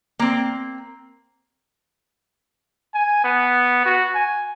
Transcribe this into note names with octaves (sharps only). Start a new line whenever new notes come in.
A#3 C4
G#5
B3
F#4
G#5